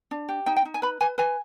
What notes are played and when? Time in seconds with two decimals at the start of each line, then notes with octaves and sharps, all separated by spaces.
0.11 D4
0.29 G4
0.46 D#4 G5
0.56 G5
0.65 D#4
0.74 G#5
0.82 B4 B5
1.01 B4 G#5
1.18 B4 G#5